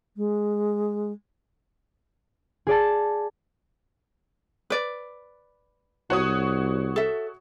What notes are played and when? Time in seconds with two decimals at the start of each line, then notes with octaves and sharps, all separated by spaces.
0.17 G#3
2.67 G#4 D5 A5
4.70 B4 D5
6.10 C2 F#4 C#5 D#6
6.96 A4 E5